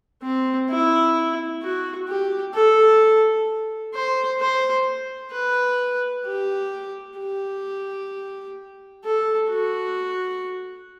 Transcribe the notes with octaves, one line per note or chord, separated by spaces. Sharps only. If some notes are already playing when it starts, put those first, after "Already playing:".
C4
E4
F#4
G4
A4
C5
C5
B4
G4
G4
A4
F#4